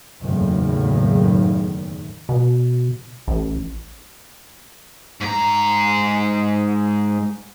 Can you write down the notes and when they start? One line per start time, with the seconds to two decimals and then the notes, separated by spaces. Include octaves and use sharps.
0.21 F#1 E2 A2 D#3
2.29 B2
3.28 A1
5.20 G#2 A#5